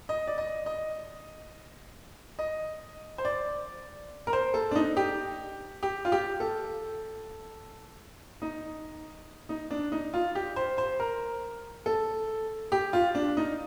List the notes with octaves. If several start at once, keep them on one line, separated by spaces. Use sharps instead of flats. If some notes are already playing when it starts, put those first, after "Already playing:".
D#5
D5
D#5
D#5
D#5
C5
D5
A#4
C5
A4
D4
D#4
G4
G4
F4
G4
A4
D#4
D#4
D4
D#4
F4
G4
C5
C5
A#4
A4
G4
F4
D4
D#4